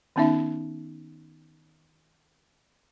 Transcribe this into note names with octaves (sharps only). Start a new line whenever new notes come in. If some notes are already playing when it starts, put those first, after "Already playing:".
D#3 B3 C#4 D#4 E5